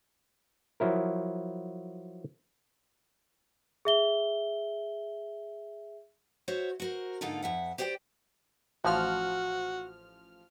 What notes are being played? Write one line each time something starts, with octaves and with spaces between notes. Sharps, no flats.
F3 F#3 E4 A#4
G#4 E5 G7
F#4 C5 C#5 E5
F#4 A#4 C5
G#2 D3 A#3 D#4 F4 A4
F2 E5 F#5
G4 C5 D5 F#5 G5
A1 F3 F#4 F6